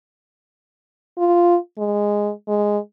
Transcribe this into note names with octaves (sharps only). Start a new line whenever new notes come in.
F4
G#3
G#3